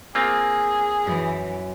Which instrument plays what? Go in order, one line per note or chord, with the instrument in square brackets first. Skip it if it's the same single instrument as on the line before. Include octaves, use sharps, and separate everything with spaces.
[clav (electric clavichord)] A#3 C4 F4 [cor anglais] G#4
[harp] F#2 [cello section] E3